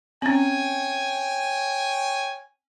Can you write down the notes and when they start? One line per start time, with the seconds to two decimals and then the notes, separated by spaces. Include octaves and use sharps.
0.22 C4 C#4 C#5 G5 G#5